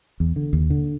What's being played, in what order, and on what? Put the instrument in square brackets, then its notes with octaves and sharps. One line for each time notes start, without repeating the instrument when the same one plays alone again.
[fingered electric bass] E2
D3
D#2
D3